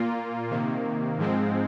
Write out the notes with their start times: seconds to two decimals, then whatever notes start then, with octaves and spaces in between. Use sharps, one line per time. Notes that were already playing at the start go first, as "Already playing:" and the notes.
Already playing: A#2 A#3 F4
0.51 C3 D#3 A#3
1.18 G#2 F3 G#3 C4